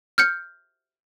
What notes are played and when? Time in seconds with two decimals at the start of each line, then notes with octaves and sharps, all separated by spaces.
0.18 F6 G6 C#7